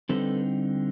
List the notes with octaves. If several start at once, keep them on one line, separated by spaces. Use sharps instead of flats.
D3 G3 C4 D#4 A4 B4